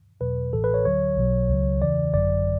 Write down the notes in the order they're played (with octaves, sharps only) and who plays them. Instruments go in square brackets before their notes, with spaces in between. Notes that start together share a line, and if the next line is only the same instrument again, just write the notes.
[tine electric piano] E2 B2 F#3 B4
A1 A2 E3 A4
B4
C#5
D2 D3 F#3 C#5
B1 B2 F#3
C#2 C#3 F#3
E2 C#3 E3 D5
G#1 F#2 D3 F#3 D5